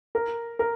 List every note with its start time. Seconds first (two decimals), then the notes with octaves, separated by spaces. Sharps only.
0.15 A#4
0.59 A#4